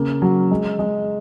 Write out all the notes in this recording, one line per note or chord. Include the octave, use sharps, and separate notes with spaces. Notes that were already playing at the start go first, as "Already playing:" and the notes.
Already playing: C#3 A#3
F#3
G#3
G#3